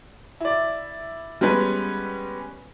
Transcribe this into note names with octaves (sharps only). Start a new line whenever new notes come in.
E4 D5
G3 G#3 B3 C#4 B4